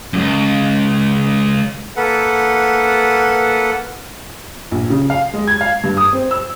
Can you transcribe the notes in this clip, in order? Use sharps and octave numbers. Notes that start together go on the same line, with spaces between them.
C#2 F#2
A#3 A4 B4 F#5
A#1
C#3
F5
G#3
G#6
F5
G2
D#6
C4
E6